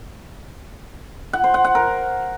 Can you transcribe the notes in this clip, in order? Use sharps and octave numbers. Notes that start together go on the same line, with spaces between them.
F#5
C5
F#5
F#5
A#4